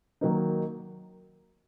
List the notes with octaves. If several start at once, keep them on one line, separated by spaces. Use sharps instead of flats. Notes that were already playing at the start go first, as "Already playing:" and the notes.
D#3 F#3 A#3 D#4